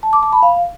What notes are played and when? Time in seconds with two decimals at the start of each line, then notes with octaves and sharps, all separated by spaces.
0.03 A5
0.13 D6
0.23 A5
0.33 B5
0.43 F5